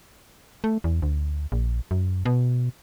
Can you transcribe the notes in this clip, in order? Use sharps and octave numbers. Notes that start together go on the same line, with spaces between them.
A3
E2
D2
A#1
F#2
B2